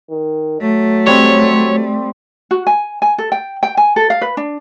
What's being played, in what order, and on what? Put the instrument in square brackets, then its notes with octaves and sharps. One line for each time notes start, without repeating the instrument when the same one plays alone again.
[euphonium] D#3
[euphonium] F#3 [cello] A3
[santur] G3 C4 [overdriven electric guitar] C#5
[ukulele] F#4
G#5
G#5
A4
G5
G5
G#5
A4
F5
B4
D4